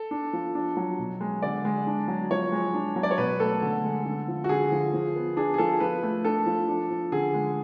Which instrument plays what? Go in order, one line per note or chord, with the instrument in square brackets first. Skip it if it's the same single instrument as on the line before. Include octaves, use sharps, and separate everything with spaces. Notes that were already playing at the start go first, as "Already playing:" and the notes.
Already playing: [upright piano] A4
D4
F3
D4
F#3
B2
G#3
D3 D5
G#3
D4
F#3
F3 C#5
G#3
D4
F#3
D5
C#5
B2 B4
A3 A4
D3
G#3
D3
F3
F#4
D3 G#4
F3
F3
B3
D4 G#4
G#4
F3 A4
F3 B4
A3
D4 A4
F3
D4
F3
D3 G#4
G#3